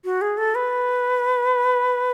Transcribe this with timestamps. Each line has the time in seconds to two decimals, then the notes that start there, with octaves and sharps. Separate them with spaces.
0.05 F#4
0.21 G#4
0.37 A4
0.55 B4